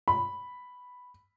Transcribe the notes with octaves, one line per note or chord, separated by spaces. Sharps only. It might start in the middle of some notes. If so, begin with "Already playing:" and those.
B5